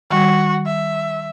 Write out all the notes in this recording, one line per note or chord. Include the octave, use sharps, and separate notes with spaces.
D#3 G3 F#4
E5